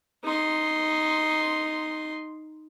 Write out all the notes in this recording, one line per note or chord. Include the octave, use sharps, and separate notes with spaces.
D#4 C6